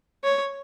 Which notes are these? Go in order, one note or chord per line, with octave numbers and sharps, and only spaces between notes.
C#5